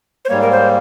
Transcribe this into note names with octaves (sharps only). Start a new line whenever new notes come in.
C5
G#2 G3 A#3 C#5
A#4
C5